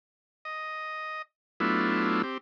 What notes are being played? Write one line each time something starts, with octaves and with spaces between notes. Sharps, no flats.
D#5
F#3 A3 B3 D4 E4 F4
C4 G4